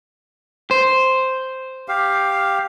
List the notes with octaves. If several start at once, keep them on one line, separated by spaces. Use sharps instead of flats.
C5
G4 F5